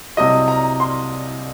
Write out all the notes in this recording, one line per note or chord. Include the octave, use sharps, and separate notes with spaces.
C2 C3 F#3 D#5
A#5
C6